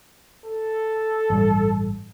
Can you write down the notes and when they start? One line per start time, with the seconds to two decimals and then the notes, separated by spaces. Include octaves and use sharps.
0.45 A4
1.30 A1 G2